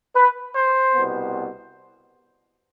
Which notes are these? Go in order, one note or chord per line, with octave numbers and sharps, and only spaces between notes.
B4
C5
C2 B2 B3